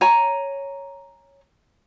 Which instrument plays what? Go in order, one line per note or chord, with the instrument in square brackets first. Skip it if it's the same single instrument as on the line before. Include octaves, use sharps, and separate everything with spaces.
[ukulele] C#5 G#5 A#5